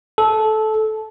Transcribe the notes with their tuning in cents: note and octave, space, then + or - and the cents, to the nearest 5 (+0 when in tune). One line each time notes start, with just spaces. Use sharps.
A4 -15